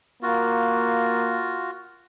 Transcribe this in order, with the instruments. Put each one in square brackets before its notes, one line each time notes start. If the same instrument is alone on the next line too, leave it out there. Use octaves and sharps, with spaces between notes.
[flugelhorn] A#3 [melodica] F4 F#4